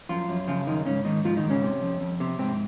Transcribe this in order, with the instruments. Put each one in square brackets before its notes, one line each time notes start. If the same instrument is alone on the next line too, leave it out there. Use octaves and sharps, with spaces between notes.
[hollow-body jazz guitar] F#2 F3 F4
F#2
C#3 F3 F4
F#2 D#3 D#4
G#2 C#3 C#4
G#2 D#3 D#4
G#2 F3 F4
D#3 D#4
G#2
C#3 C#4
C3
F2
F2
C3
G#2 C3 C4